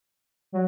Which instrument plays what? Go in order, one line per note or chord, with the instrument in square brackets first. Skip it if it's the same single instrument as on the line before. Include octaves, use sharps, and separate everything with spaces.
[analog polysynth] F#3